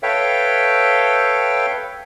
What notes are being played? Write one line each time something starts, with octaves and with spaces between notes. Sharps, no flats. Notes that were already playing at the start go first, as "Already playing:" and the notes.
A4 B4 C#5 E5 F5 G5